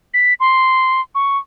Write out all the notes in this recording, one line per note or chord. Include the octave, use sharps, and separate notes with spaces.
B6
C6
C#6